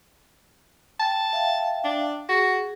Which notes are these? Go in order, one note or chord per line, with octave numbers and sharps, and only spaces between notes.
G5 A5
E5 F5 G5
D4
F#4 G#4